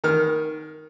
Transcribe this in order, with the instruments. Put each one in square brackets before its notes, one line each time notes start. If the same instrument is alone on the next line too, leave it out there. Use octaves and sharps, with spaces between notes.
[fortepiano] D#3 F6